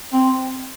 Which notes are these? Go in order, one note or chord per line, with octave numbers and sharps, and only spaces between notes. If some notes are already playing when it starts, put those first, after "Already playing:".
C4